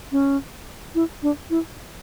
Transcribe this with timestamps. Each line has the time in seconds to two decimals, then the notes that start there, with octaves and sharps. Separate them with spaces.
0.12 C#4
0.95 E4
1.23 D4
1.50 E4